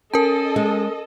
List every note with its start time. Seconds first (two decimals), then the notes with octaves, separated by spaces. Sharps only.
0.14 C#4 A4 A#4 D#5 A5
0.56 G#3